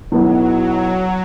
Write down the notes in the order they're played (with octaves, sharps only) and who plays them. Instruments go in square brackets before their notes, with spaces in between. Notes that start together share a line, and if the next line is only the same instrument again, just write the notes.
[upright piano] B1 B2 B3 E4 [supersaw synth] F#3